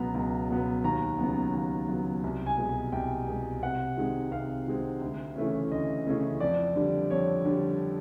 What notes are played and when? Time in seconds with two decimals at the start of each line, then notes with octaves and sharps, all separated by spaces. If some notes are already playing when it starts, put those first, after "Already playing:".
Already playing: C#2 B2 F#3 B3 A#5
0.15 C#2
0.49 B2 F#3 B3
0.84 D#2 A#5
1.19 C#3 F#3 B3
1.53 D#2
1.88 C#3 F#3 B3
2.24 C2
2.46 G#5
2.58 B2 G#3
2.69 G#5
2.92 C2 G5
3.27 B2 G#3
3.62 C3 F#5
3.97 D#3 G#3 C4
4.31 C3 F5
4.67 D#3 G#3 C4
5.01 D2
5.36 C#3 E3 A3 C#4
5.71 D2 D#5
6.06 C#3 E3 A3 C#4
6.40 F2 D5
6.76 D3 G3
7.11 F2 C#5
7.45 D3 G3